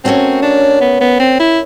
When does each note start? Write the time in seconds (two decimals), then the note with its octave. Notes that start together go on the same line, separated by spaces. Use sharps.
0.04 A3 C4 C#4 F#4 A#4 C#5
0.42 D4
0.81 B3
1.01 B3
1.20 C4
1.39 E4